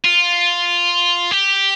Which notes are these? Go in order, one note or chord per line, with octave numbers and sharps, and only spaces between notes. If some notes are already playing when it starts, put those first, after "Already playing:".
F4
G4